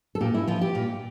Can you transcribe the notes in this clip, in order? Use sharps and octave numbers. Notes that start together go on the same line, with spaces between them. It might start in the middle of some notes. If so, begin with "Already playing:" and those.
A4
A#2 G4
E4
F3 F4
G4
A#2